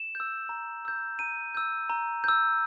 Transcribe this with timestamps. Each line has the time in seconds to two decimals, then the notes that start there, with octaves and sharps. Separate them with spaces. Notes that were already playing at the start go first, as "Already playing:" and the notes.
Already playing: E7
0.15 E6 G6
0.49 A#5
0.85 E6 G6
1.19 A#5 D#7
1.55 E6 G6
1.90 A#5
2.24 E6 G6